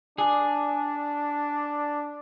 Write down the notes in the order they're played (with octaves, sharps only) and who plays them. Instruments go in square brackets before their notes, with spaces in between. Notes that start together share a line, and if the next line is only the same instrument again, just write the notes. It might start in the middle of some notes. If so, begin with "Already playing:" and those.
[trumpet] D4 [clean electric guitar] G#4